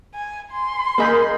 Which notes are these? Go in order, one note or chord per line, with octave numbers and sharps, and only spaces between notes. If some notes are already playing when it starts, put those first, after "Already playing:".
G#5
C6
A#3 G#4 A#4 D#5 B5 G6